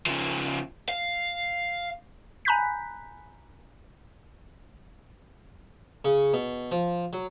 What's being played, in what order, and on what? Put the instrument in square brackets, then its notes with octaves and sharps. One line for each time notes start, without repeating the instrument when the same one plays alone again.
[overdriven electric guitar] C#3 F3
F5
[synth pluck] G#5 A#5 B5 F#6 G6 B6
[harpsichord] C#3
B2
F3
F#3